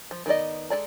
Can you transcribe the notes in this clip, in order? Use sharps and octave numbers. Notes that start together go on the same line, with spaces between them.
F3
D#3 B3 E4 D5 D#5
G#3 D4 A4 D5 A#5